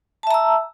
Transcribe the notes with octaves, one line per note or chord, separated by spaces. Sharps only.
E5 A5 A#5 E6